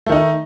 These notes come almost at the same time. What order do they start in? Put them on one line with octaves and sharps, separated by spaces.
A3 D#3 D#4